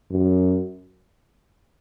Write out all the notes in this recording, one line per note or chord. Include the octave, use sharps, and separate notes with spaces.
F#2